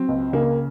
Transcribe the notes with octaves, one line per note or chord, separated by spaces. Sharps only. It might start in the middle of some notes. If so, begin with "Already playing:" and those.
Already playing: F#3 C4
C#2
C#3 A#3